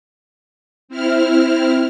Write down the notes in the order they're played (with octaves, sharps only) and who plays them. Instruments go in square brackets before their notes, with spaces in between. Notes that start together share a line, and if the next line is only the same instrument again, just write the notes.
[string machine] C4 E4 F6